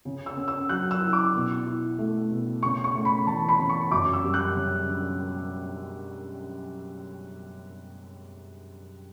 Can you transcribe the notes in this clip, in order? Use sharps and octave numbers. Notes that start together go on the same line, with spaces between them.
C#3
E6
C#4
E6
F#3 F#6
E6
E4
D6
B2
E4
A3
B2
C#3 C#6
C#6
A3
B5
E3 A5
B5
C#3
C#6
F#2 D6
E6
G3
F#6
C#3
D4